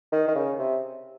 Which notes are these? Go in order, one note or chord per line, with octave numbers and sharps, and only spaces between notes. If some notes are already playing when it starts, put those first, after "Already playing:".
D#3
D#3
C#3
C3